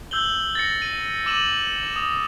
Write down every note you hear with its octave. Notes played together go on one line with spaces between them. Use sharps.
E6 G6 F#7 G7
A6 A#6 C#7
D#7
D6 E6 D#7 E7 F#7
D#6